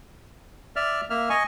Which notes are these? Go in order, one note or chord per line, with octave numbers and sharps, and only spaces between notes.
D5 E5 F6
A#3 E5 F6
D#5 G#5 C#6